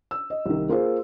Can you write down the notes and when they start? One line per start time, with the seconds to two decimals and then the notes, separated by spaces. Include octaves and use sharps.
0.11 E6
0.30 D#5
0.46 C2 D#3
0.69 A#3 F4 G#4 C5